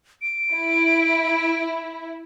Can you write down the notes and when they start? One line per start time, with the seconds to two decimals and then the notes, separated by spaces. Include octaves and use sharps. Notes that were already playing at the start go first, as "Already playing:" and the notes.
0.22 D7
0.53 E4